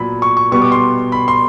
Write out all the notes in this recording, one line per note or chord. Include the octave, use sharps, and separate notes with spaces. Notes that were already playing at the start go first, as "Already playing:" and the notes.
Already playing: A#2 F#3 B3 B5
C#6
C#6
B2 G3 B3 C#6
D6
C6
B5
C6